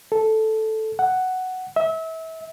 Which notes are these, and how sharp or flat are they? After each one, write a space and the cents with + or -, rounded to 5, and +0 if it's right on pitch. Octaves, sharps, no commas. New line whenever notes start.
A4 -5
F#5 +5
E5 -30